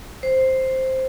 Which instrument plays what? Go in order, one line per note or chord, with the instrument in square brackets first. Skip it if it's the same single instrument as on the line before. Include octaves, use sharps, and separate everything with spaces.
[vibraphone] C5